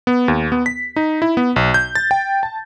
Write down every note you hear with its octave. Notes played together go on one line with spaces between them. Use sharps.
B3
D#2
B3
B6
D#4
E4
B3
B1
G6
A6
G5
A5